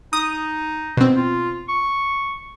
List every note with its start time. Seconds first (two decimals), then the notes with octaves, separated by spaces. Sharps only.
0.13 D#4 D#6
0.97 B2 C4
1.17 F4
1.69 C#6